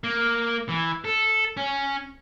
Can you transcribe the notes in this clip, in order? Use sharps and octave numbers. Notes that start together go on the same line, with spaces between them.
A#3
E3
A4
C#4